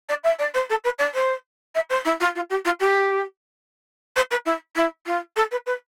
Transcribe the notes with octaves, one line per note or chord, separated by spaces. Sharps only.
D5
E5
D5
C5
A4
B4
D5
C5
E5
C5
E4
F4
F4
G4
F4
G4
C5
B4
E4
E4
F4
A4
B4
B4